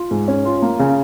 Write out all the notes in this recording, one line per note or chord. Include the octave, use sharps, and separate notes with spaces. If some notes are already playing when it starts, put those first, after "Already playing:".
Already playing: F4
G#2
C#4
F4
A#3
C#3